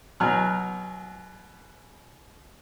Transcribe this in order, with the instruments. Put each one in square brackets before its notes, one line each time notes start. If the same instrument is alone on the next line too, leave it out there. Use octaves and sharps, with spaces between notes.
[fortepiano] B2 F#3 G#5 A#5 F6 F#6